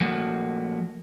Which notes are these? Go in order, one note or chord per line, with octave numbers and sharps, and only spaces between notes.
F3 A3 A#3 F#4